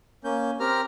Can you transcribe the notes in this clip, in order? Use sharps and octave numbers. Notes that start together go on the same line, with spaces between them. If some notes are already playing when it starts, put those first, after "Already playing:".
A#3 C#4 G6
C4 G4 A#4 A#5 F6